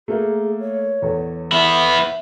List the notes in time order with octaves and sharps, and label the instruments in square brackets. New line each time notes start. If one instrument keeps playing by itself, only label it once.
[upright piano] A3 A#3 [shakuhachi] G#4
[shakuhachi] C#5
[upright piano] E2 A4
[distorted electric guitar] B3 E4 [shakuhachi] E5